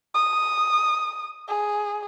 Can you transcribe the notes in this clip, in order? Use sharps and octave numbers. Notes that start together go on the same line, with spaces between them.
D#6
G#4